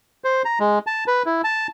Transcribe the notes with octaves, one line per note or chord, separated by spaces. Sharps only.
C5
A#5
G#3
A5
B4
E4
A5